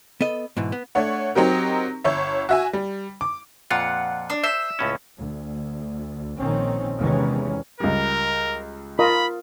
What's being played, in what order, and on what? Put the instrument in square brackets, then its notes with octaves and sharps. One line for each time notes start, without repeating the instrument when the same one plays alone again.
[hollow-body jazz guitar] B3 A4 D#5
G#2 B2 E3
B3
[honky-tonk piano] A3 D4 C#5 F#5
F#3 C4 D#4 G4 A#4
G1 C#5 E5
F#4 E5 G#5
G3
D6
[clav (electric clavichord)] F2 A#2 F4 [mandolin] F#5
[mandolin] D4
[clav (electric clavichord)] C5 [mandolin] E5
[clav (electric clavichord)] C#2 A2 C#4
[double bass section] D2
A#1 D#3 C4 C#4
E2 C3 D#3 E3 G#3 C#4
[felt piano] C#2 G3 [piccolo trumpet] A#4
[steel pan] F4 A#4 D#5 [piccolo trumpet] B5